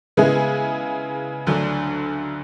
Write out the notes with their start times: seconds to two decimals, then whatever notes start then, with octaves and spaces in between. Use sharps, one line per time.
0.17 C#3 G#3 B3 E4 G#4
1.47 D2 D3 F#3 A3 D4